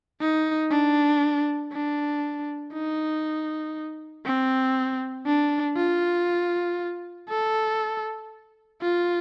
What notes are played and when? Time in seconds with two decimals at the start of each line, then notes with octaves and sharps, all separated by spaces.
0.21 D#4
0.71 D4
1.73 D4
2.74 D#4
4.26 C4
5.27 D4
5.77 F4
7.30 A4
8.82 F4